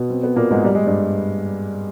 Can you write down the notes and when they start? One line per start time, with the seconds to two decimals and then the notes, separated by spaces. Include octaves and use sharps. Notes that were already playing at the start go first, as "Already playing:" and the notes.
Already playing: B2 B3
0.10 C4
0.23 B3
0.36 A#2 A#3
0.51 G#2 G#3
0.65 G3
0.75 G#3
0.86 G2 G3